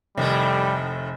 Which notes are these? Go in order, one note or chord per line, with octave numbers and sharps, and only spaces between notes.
F1 A2 D#3 G3 A3